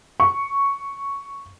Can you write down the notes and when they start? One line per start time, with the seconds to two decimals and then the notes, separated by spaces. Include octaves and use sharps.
0.20 C#6